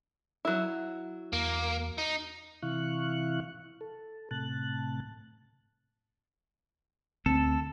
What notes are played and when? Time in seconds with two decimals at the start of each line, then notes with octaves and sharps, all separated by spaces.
0.45 F#3 E4
1.33 E2 A#3
1.98 D#4
2.62 C3 E3 E4 F5 C#6 F#6
3.81 A4
4.31 A2 C3 A5 F#6
7.26 D2 C4 A4